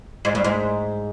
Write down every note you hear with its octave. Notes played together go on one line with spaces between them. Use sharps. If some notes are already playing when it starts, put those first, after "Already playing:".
G#2
G2
G#2